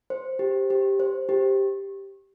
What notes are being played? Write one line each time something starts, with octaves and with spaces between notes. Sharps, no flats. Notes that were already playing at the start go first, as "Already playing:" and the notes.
C5
G4
G4
C5
G4